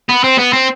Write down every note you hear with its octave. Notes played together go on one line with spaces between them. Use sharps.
B3
C4
B3
C4